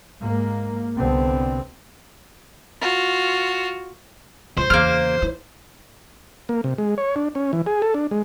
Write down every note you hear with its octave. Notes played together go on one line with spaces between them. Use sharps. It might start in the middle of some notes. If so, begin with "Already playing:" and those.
G#2 A#3
C2 D3 B3 C4
F4 F#4
C#2 C5
E2 C#3 A#3 F6
E4
A#3
C3
G#3
C#5
D4
C#4
E3
G#4
A4
D4
G#3